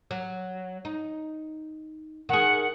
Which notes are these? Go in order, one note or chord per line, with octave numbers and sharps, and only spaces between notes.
F#3
D#4
D#3 G#4 F#5